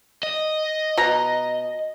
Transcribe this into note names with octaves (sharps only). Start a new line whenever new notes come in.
D#5
B2 A#5